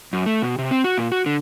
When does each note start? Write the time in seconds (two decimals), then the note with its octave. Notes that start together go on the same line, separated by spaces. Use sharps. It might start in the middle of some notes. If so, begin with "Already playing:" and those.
0.13 F#2
0.26 A3
0.42 B2
0.58 C3
0.71 C4
0.84 F#4
0.98 A#2
1.12 F#4
1.26 D3